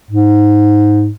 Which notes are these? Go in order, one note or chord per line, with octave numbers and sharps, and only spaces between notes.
G#2